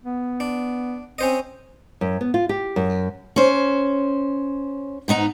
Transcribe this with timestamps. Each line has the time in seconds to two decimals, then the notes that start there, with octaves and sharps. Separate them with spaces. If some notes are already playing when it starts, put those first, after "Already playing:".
0.04 B3
0.40 D4
1.18 C4 C#4 C5 D#5
2.01 F#2
2.21 B3
2.34 F4
2.49 G4
2.76 F#2
3.36 C#4 C5
5.08 G#2 B3 D#4 A#5